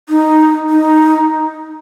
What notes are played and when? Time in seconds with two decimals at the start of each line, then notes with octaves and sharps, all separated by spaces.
0.09 D#4
0.70 D#4